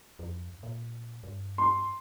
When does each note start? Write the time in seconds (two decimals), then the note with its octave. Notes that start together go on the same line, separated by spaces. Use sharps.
0.19 F2
0.63 A#2
1.23 G2
1.58 C6